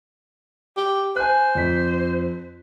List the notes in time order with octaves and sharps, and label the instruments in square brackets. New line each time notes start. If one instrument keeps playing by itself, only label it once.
[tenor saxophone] G4
[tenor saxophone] C5 [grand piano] G#5 F#6
[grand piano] F2 B6